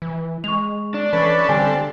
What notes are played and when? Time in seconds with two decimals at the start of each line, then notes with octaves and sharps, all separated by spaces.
0.02 E3
0.44 G#3 C#6 F7
0.94 D4
1.13 E3 C#4 A4 B4
1.49 D3 G3 C4 A4 G#5